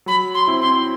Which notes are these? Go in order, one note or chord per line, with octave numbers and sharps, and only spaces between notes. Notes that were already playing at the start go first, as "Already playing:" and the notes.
F#3 B5
C6
C4 E4
C6